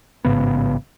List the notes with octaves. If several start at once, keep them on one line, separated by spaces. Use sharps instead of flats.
A1 G#2 C#3 B3